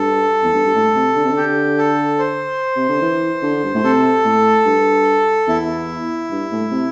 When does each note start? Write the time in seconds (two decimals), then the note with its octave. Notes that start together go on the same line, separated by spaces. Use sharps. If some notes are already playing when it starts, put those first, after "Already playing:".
Already playing: G2 A4
0.43 E2
0.54 G2
0.66 G2
0.75 A2
0.95 C3
1.15 D3
1.25 C3
1.32 D3 G4
1.78 A4
2.19 C5
2.76 C3
2.88 D3
3.01 E3
3.42 D3
3.64 G2
3.75 A2
3.84 C3 A4
4.25 A2
4.66 G2
5.48 E2 E4
6.31 G2
6.52 A2
6.71 C3